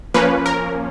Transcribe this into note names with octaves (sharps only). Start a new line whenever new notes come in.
F3 A#3 C#4 B4
A#4